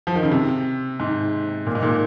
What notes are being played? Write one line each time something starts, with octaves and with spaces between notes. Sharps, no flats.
F3
D#3
C#3
C3
G#2
A#2
G#2
A#2